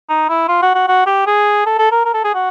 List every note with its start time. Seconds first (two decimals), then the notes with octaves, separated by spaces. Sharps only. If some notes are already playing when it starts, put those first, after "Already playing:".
0.09 D#4
0.29 E4
0.48 F4
0.62 F#4
0.75 F#4
0.88 F#4
1.06 G4
1.27 G#4
1.66 A4
1.78 A4
1.91 A#4
2.05 A#4
2.14 A4
2.24 G#4
2.34 F#4